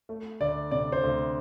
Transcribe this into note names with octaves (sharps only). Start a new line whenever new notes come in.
A3
D2 D5
C3 D5
C5
D2